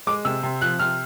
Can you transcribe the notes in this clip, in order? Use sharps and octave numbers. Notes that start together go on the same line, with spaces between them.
G#3 D6
C3 E6
C3
F3 F#6
C3 F6